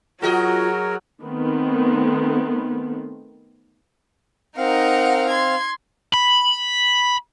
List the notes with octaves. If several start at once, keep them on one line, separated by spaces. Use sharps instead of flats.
F#3 F4 F#4 G#4 A#4 D#5
D#3 A3 B3 C4
C4 D#4 A#4 F5 F#5
C6 G#6
B5